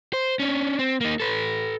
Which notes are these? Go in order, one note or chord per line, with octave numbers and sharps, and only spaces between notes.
C5
C#4 D4
C4
A#3 D#4
A4 B4